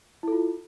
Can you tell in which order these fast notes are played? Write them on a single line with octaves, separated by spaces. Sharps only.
E4 A4 F4